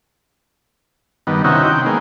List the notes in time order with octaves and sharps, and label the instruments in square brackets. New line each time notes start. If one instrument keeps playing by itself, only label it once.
[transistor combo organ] G2 D#3 B3
C3 D#3 C#4 D#4 E4 F#4
C4 G5
G#3 A#3 B3